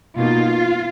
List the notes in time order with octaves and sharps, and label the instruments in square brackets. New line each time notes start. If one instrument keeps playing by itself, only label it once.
[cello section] B2 A#3 D#4 F4